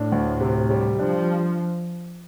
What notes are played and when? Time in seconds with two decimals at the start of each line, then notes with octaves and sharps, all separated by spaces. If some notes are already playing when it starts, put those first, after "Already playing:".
Already playing: A2 D4
0.12 D2
0.41 C3
0.70 G3
0.99 F3 D4